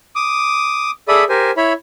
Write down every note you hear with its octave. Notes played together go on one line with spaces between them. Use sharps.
D6 D#6
G#4 A4 D5 E5 B5 D#6
G4 A#4 C5 G#5
E4 C#5 E5 B5